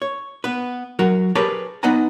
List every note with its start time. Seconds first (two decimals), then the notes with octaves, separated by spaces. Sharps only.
0.02 C#5
0.44 B3 B4
0.99 F#3 F#4 A#4
1.35 G4 G#4 A#4 B4 C#5 A5
1.83 B3 D#4 B4 F#5 G#5 A#5